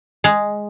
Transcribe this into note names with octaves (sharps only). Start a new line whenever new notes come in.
G#3